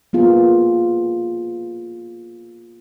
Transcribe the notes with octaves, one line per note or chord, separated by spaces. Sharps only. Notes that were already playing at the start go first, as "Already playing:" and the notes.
A#3 B3 F4 G#4